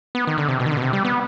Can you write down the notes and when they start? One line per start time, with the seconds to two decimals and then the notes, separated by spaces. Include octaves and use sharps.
0.15 B3
0.27 D#3
0.38 D3
0.48 C3
0.60 B2
0.66 D#3
0.71 D3
0.77 B2
0.82 C3
0.93 G3
1.05 B3